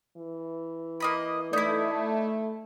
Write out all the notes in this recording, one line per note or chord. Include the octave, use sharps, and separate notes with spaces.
E3
A#3 D#5 B5
A3 D#4 E4 D5 B6